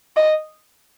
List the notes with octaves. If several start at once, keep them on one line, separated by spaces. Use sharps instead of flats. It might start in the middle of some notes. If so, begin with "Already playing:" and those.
D#5